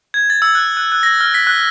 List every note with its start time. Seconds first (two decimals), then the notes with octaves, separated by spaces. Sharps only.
0.14 G#6
0.30 A6
0.42 E6
0.55 F#6
0.77 F#6
0.92 F#6
1.03 A#6
1.20 F6
1.34 B6
1.47 F#6